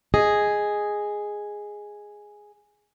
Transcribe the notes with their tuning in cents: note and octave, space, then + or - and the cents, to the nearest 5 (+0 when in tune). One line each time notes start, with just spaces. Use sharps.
G#4 +0 D#5 +0